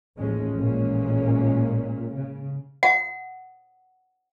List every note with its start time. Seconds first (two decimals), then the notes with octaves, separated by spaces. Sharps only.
0.18 A1 D#2 F3 G#3 C#4
0.58 A1 A#2 G#3 A#3 C#4
2.17 C#3
2.83 F#5